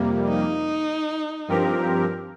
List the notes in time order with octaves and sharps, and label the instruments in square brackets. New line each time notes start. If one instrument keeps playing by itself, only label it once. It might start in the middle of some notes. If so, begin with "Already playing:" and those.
Already playing: [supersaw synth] F2 C3 G3 A#3
[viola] D#4
[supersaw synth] G2 F3 C4 G4 A#4